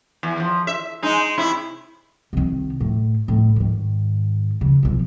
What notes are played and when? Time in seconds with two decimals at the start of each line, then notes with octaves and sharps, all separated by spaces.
0.23 E2
0.40 F3
0.67 E5
1.03 G#3 D#4
1.38 C3 E4
2.33 C2 D#3
2.80 A2
3.28 A2
3.56 G#2 D#3
4.61 C#3
4.83 B1 F3